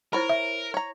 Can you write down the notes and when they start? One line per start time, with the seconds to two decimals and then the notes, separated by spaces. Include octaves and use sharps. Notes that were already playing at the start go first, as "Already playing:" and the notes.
0.13 E4 A#4 C5 C#5 A#5 B5
0.29 E5
0.74 C#5 A#5